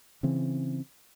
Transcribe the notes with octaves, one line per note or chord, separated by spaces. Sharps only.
C#3 E3 C4